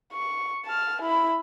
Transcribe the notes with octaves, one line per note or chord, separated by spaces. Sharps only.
C#6
A5 F6
E4 B5